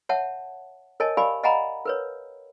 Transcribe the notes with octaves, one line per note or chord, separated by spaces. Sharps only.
C#5 E5 F#5 A5
A#4 C#5 D#5 G#5 A5
G4 A#4 D5 F5 G#5 B5
D#5 F5 F#5 G#5 A#5 B5
A#4 B4 C#5